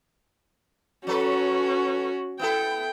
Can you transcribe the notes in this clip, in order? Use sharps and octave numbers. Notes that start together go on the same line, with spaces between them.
F#3 C#4 F#4 A4 B4
B3 E4 A4 G5